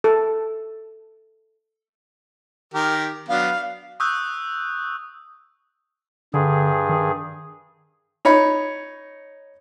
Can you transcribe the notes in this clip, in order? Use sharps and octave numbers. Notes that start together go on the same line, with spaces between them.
A4
D#3 G4 A#4
F#3 B3 D4 F5
C#6 D#6 E6 F#6 G6
G2 D3 G#4
D#3
D#4 C#5 B5